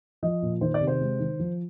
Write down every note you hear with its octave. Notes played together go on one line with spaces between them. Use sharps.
F3 D#5
A#2
D#3 C5
D5
C3
C5
G#3
D#3
F3